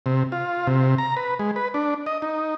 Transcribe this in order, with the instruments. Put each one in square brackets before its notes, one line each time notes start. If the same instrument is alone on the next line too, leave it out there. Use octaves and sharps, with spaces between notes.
[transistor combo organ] C3
F4
C3
A#5
B4
G#3
B4
D4
D#5
D#4